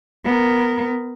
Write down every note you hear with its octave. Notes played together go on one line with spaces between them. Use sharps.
B3 A#4